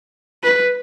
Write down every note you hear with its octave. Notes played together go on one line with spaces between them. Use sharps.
B4